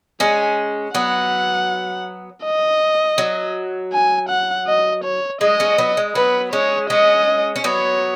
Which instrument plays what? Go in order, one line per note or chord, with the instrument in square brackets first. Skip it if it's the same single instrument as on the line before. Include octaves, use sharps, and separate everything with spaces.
[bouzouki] G#3 C#4 [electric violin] G#5
[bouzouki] F#3 B3 [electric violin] F#5
[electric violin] D#5
[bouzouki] F#3
[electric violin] G#5
F#5
D#5
C#5
[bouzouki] G#3 [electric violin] D#5
[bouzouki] G#3 C#4
F#3 B3
G#3
[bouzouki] F#3 B3 [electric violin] B4
[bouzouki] G#3 C#4 [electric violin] C#5
[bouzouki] G#3 C#4 [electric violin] D#5
[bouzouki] C#4
[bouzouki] F#3 B3 [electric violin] C#5